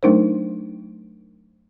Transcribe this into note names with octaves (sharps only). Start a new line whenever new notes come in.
F#3 A3 D4 D#4 A#4 C5